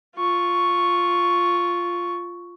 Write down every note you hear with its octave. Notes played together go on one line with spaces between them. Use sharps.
F4 C#6